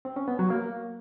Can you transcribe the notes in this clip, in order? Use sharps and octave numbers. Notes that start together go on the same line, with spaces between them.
C4
C#4
B3
F#3
A#3